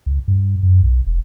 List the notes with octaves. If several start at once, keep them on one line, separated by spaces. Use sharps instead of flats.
C#2
G2
F#2
B1
E1